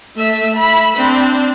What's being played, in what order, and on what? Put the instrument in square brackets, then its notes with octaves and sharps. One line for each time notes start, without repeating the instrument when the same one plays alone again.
[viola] A3 E5
E5 B5
C4 D4